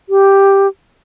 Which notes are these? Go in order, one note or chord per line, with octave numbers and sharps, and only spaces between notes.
G4